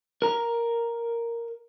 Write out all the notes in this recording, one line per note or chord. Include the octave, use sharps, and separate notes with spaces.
A#4 A#5